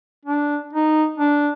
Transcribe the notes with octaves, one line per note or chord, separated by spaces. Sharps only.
D4
D#4
D4